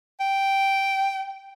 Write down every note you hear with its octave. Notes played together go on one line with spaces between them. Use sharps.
G5